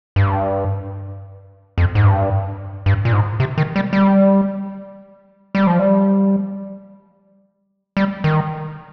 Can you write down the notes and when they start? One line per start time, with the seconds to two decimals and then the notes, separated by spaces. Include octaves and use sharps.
0.16 G2
1.78 F2
1.95 G#2
2.05 G2
2.86 G2
3.05 A#2
3.13 G#2
3.40 C3
3.58 D#3
3.76 G3
3.93 G3
5.55 G3
5.67 F3
5.79 G3
7.97 G3
8.24 D#3